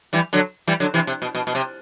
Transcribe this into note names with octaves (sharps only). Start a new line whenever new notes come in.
E3 G3
D3 F#3
E3 G3
D3 F#3
C3 E3
C3
B2
B2
B2
C3